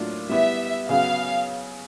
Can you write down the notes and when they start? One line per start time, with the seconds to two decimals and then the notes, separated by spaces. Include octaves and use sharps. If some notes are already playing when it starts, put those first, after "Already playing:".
Already playing: A2 F#3 A#3 D4 F4
0.29 G3 B3 E4 E5
0.89 C#3 F#3 B3 F5